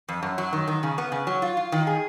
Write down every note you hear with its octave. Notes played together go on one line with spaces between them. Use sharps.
F2
F#2
F#3
D#3
D#3
C#3
B3
C#3
F#3
F4
F4
D#3
G#4